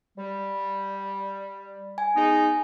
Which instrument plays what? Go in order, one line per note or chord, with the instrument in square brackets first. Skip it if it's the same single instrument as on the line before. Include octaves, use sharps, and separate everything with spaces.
[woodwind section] G3
[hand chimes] G#5
[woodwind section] G#3 B3 D#4